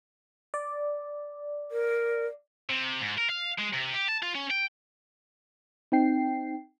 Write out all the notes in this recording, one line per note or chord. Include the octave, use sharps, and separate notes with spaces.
D5
A#4
C3
G#2
A#4
F5
G#3
C3
G4
A5
F4
C#4
G5
C4 D#4 G5 C7